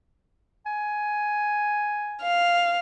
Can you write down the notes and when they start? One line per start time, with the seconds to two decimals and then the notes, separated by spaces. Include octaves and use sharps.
0.66 G#5
2.22 F5